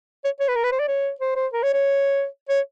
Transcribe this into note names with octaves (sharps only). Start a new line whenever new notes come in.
C#5
C#5
B4
A#4
B4
C5
D5
C#5
C5
C5
A#4
C#5
C#5
C#5